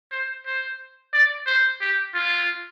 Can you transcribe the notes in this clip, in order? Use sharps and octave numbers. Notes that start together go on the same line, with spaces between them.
C5
C5
D5
C5
G4
F4